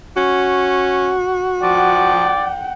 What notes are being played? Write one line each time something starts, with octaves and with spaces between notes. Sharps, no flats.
C#4 F#4
F3 D5 F#5 G5